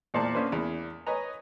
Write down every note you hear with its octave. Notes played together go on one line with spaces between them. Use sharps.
E2 A#2 C5 D5 A5
A#3 B3 C#4 D4 B4 C5
E2 B5
B4 C#5 D#5 G#5 A#5